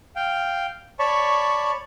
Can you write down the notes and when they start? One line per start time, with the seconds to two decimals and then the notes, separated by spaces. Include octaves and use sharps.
0.16 F5 G5
0.99 C#5 D5 A5 B5 C#6